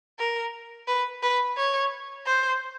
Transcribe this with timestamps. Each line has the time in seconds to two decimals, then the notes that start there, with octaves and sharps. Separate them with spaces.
0.19 A#4
0.87 B4
1.22 B4
1.57 C#5
2.26 C5